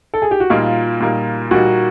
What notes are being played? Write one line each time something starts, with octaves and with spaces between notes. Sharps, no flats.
A4
G#4
G4
F#4
A#2 G3 A#3 D#4 F4
A#2 G3 A#3 D#4
A#2 G3 A#3 D#4 F#4